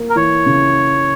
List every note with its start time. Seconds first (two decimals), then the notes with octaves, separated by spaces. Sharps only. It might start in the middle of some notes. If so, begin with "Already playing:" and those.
Already playing: A#3
0.10 A#4
0.16 E3 C#5
0.46 C#3